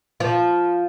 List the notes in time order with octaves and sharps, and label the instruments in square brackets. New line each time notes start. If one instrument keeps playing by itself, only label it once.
[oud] F3